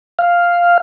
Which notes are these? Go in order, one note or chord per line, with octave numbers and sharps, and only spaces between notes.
F5